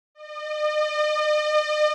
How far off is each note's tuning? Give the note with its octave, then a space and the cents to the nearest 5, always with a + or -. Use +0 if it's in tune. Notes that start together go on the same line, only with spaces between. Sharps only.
D#5 -45